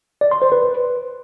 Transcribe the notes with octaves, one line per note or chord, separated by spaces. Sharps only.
D5
C6
C5
B4